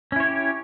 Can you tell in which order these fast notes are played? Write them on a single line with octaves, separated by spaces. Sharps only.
C#4 E4 C#5 G4